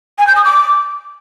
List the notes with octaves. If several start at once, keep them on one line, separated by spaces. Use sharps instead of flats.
G#5
G6
D#6
D6